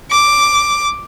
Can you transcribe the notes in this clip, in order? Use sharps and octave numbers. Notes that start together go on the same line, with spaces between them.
D6